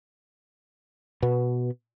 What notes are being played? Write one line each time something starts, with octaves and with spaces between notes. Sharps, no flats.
B2 B3